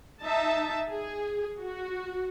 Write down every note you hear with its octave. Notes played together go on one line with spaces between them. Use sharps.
D#4 E5 A5
G#4
F#4